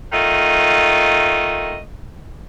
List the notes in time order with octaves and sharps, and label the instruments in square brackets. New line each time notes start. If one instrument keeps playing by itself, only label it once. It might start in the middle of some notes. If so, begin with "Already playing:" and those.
[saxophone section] D#3 A3 F4 D#5